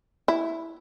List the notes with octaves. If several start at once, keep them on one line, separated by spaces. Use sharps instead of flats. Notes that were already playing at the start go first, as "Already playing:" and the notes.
E4